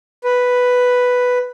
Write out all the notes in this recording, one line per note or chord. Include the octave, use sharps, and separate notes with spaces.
B4